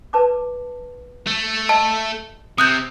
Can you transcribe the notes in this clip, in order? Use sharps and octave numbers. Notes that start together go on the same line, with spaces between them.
B4 A5 D6
A3
D#5 A5
C3 D#6 F#6 G6